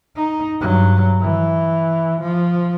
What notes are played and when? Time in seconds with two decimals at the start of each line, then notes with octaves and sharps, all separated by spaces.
0.16 D#4
0.60 G2 F#3
1.21 E3
2.21 F3